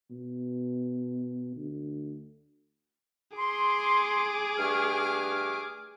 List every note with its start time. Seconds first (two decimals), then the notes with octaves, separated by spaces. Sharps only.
0.11 B2
1.56 D2
3.37 G#4 C6 D6
4.58 G2 A3 F6